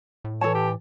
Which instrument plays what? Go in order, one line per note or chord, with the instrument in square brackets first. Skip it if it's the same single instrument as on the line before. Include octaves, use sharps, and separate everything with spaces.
[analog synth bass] A2
[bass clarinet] E3 [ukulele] A4 A5 [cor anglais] C#5
[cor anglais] G4